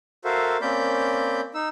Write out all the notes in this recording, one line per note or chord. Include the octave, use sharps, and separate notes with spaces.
F#4 A4 A#4 C5 E5 F5
A#3 C4 C#4 D5 B5 G6
D#4 E6